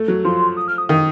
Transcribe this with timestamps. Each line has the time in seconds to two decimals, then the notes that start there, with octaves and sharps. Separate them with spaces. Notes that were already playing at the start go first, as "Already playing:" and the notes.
Already playing: A3
0.08 F#3
0.24 F3 C6
0.57 D#6
0.68 F6
0.78 D#6
0.89 D#3 D#6